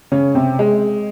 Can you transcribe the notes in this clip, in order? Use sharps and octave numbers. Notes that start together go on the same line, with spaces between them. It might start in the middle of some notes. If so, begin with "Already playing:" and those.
C#3 C#4
C3 C4
G#3